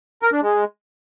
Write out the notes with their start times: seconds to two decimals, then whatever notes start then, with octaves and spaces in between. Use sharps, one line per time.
0.22 A#4
0.32 D4
0.43 G#3